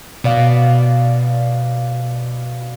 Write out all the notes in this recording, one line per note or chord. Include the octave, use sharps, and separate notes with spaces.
B2 D5 F5